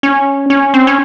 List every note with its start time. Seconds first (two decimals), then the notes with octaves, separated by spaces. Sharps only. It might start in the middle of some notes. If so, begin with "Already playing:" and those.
0.03 C#4
0.50 C#4
0.74 C4
0.87 C#4